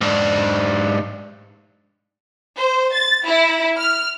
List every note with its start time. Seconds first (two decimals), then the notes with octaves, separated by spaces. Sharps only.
0.01 G#2 D4
2.56 C5
2.95 A6
3.26 E4
3.78 F6